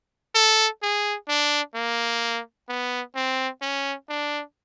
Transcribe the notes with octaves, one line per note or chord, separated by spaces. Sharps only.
A4
G#4
D4
A#3
B3
C4
C#4
D4